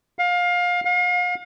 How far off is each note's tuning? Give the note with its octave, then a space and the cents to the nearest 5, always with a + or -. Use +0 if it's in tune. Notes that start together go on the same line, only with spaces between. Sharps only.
F5 +25
F5 +40